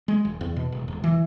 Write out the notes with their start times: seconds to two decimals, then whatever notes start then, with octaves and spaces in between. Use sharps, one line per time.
0.08 G#3
0.25 E1
0.41 E2
0.57 B2
0.72 E1
0.88 E1
1.04 E3